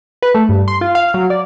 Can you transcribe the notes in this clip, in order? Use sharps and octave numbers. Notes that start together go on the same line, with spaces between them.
B4
A3
G2
C6
F4
F5
F#3
D5